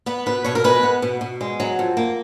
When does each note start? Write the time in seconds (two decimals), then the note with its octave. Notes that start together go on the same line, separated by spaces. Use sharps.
0.06 B3 B4
0.26 B2 B4
0.44 B2 C#5
0.55 A#4
0.64 G#3 B4
0.83 B3
1.02 B2
1.21 B2
1.41 G#3
1.60 F#3
1.79 F2
1.97 A#3